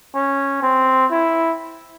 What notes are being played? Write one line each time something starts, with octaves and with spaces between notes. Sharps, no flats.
C#4
C4
E4